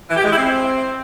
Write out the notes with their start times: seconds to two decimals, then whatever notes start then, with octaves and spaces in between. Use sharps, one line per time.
0.09 E3
0.17 G4
0.24 G#3
0.31 E4
0.38 C4